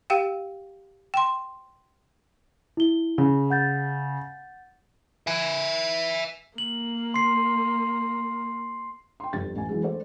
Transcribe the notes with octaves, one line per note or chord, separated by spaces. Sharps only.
G4 F5 G5
G5 C6
E4 G7
C#3
F#5 G6 A6
E5 G#5
A#3 F#7
C6 C7
G5 C6
G1 F2 G4 A6
A1 G#5
E3 F#3 G#3
A3 C5 D5